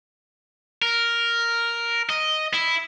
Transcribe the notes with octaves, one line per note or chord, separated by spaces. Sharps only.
A#4
D#5
E4